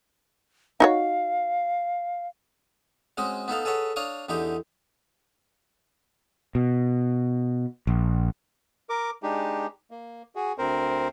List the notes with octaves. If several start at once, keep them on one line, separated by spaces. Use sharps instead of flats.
D#4 F#4 C#5 F5
G#3 C4 C#4 F#4 D#5
B3 D#4 A4 F5
G#4 A4 B4 C#5 F#5
D4 C#5 F5 C#6 D#6
E2 D3 D#4 G4 D#5
B2
A#1
A#4 D6
G#3 D4 D#4 G4
A#3
F#4 G#4
D2 C4 A#4 C5